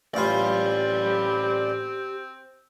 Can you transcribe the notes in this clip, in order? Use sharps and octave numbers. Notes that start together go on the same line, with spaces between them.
A1 C4 F4 G4 D5 B5